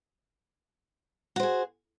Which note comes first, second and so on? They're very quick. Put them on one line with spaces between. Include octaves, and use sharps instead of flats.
F#4 C5 G#4